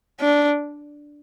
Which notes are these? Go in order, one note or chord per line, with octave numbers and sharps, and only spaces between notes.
D4